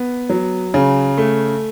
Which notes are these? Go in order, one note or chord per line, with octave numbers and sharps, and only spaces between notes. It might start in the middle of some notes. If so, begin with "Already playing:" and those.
Already playing: B3
F#3
C#3
A3